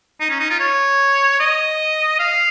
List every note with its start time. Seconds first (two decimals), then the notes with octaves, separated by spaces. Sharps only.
0.20 D#4
0.30 C#4
0.40 D#4
0.50 F4
0.59 C#5
1.40 D#5
2.19 F5